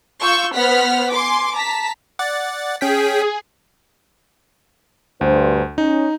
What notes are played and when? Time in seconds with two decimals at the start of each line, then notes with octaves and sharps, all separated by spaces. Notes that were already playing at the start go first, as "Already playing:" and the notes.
0.21 F4 C#6 E6 G6
0.55 B3 C5 F#5 F6 B6
1.10 G#5 C6 D6
1.54 A5 A#5 B6
2.19 D5 F#5 A6
2.81 C#4 G#4 G5 B6
5.21 D2 G2 C5
5.78 C#4 D#4